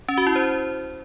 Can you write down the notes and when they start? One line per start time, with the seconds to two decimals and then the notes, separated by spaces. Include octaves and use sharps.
0.09 C#4
0.18 F#4
0.27 E4
0.36 C5